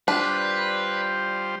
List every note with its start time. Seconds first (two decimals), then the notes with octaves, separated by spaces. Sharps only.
0.08 G3 D4 F4 B4 C5